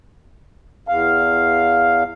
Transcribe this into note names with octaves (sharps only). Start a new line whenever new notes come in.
E2 F5